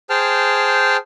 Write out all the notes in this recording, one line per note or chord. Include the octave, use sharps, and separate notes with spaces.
G#4 C5 G5 A5 F6